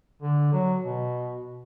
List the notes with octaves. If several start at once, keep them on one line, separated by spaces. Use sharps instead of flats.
D3
F#3
B2